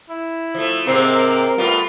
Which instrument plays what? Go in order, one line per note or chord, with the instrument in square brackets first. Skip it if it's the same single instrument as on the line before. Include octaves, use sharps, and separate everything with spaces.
[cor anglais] E4
[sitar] F3 A3
[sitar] G#2 C3 A#3 [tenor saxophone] C4
[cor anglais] A#4
[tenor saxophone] G3 [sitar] A3 B3 F4